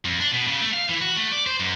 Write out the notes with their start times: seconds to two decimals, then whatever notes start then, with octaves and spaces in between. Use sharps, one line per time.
0.05 F2
0.20 D4
0.32 B2
0.47 C#3
0.61 A3
0.73 F5
0.89 E3
1.01 F#4
1.16 A3
1.32 D5
1.46 C5
1.60 F#2